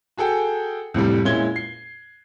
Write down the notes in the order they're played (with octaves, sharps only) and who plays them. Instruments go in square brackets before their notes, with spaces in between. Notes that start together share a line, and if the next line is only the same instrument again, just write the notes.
[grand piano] F#4 G#4 A4 G5
F2 A2 C3 G3
A#2 G#3 C#4 E4 G#6 G7
C7